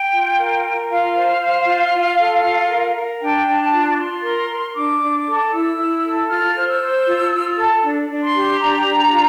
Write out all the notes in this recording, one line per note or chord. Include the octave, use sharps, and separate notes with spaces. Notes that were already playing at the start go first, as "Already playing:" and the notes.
Already playing: G5
F4
A#4
A#4
F4 F5
C5
C5
F4
F4
A4
F4
A#4
A#4
D4 G5
D4
A5
F4
D6
F4 C6
A#4
A#4
D4 D6
D4
A4
E4 E6
E4
A4
F4 F6
C5
E6
C5
F4
F4
A4
D4
D4
C6
G4
D4 A#5
D4
F4